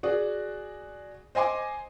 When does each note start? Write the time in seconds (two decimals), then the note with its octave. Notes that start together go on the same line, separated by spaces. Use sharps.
0.03 F#4 G#4 D5
1.35 C5 D#5 G#5 C6 D6